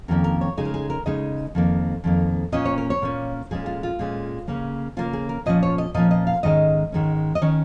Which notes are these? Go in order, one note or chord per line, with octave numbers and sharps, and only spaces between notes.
F2 D#3 A#3 C#4 A#4
A#4
C#5
C#3 G#3 D#4 G#4
A#4
G#4
A#4
C#3 G#3 D#4 D#5
F2 D#3 A#3
F2 D#3 A#3
A#2 A#3 C#4 D#5
C#5
A#4
C#5
A#2 A#3 C#4
A#2 G#3 C#4 G#4
F4
F4
A#2 G#3 C#4
C#3 A#3 C#4
C#3 A#3 C#4 F4
G#4
A#4
A#2 F3 C#4 D#5
C#5
D#5
A#2 F3 C#4 D#5
D#5
F5
G#2 D#3 G#3 C#4 D#5
G#2 D#3 G#3 C#4
D#5
D#3 C#4 C#5